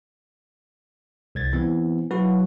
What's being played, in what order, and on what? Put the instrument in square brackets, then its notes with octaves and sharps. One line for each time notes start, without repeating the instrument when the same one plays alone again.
[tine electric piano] C2 G#6 A6
E3 B3 C4
[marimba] F#3 [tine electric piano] E4 F#4 B4